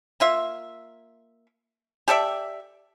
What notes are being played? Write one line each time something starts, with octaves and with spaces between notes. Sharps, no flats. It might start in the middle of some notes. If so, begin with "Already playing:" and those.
A#3 F4 E5
G4 A4 D5 E5